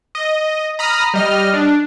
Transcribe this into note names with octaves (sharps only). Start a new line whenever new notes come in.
D#5
A#5 B5 D#6 F6
G3 D#5 F6
D4